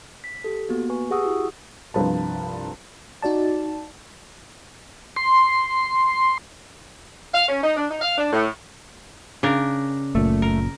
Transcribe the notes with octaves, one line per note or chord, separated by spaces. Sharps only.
B6
G4 A4
A#3 B3 F#4
B4 G#5 C#6
G4 G#4 F#5 C#6 D#6 E6
E4 F#4
C2 G2 F3 B4 A5
D#4 F#4 D5 A5
C6
F5
C#4
D#4
D4
D#4
F5
D4
A2
C#3 D4 A#4
F#1 A#2 A3
A#4